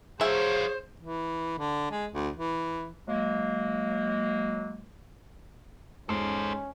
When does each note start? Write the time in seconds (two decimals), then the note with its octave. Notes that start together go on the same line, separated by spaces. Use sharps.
0.21 F#3 F4 G#4 C5 C#5 E5 G#5
1.00 E3
1.59 D3
1.91 G#3
2.12 D2
2.36 E3
3.07 F#3 G#3 A#3
6.09 G#2 C#4 A4 C5